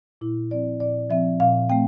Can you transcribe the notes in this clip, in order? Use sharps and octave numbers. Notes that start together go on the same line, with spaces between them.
A#2 E4
F3 C4 D5
A#2 D5
F3 C4 E5
A#2 F5
A3 C4 G5